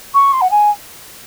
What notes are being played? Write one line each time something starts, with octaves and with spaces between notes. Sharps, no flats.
C#6
C6
F#5
G#5